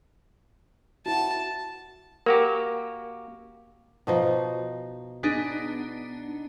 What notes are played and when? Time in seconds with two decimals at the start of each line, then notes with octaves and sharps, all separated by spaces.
1.06 E4 F#4 A5
2.26 A#3 F#4 G4 A#4
4.07 B2 F3 D#4
5.23 B3 D4 D#4 G#4